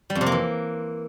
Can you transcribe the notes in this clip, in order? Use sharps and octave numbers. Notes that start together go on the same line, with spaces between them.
G3
F2
C3
A#3
E3